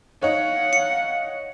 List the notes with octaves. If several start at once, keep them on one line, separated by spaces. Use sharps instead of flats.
D#4 C#5 F5 F#5
C#7